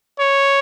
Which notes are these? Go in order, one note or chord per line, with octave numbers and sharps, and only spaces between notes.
C#5